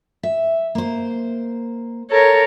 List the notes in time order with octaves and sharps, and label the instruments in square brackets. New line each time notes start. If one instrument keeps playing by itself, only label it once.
[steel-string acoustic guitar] E5
A#3 C5
[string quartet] A4 A#4 C#5